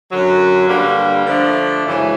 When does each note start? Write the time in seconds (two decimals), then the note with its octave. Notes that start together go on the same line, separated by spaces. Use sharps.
0.11 F#2 D3 F#3
0.69 G2 D3 G3 A#3
1.26 D3 F3 A3 D4
1.85 F#2 C#3 E3 G#3